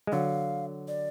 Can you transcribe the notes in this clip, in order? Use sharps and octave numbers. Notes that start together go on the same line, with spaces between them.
G#3
D3 F#3 F5
D5